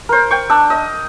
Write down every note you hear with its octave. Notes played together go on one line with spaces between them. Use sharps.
A#4 C5
G5 C#6
D4 E6
D#5